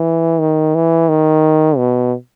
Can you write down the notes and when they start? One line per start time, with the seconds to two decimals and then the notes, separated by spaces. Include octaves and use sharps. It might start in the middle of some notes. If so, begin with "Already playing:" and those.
Already playing: E3
0.40 D#3
0.75 E3
1.09 D#3
1.77 B2